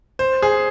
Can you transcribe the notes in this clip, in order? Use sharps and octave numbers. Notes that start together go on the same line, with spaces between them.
C5
G#4